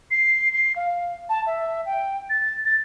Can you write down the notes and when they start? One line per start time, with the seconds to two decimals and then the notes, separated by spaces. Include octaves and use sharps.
0.11 C7
0.53 C7
0.76 F5
1.29 A5
1.47 E5
1.86 G5
2.30 A6
2.65 A6